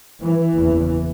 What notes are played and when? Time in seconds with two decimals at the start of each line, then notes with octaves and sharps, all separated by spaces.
0.20 E3
0.54 F#1 E2 C#3